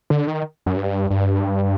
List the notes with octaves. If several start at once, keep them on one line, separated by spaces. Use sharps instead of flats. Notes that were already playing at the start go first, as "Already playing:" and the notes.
D3
D#3
F#2
G2
G2